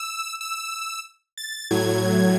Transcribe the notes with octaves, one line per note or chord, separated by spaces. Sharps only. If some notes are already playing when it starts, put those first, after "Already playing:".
Already playing: E6
E6
A6
A2 F#3 G#6